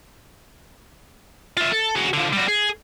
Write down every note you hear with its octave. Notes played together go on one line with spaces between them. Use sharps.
F4 E5
A4
F#4 G#4
D3 F3
G3 F#4
G#4